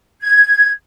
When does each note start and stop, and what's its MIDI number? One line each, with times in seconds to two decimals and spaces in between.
0.21 0.70 92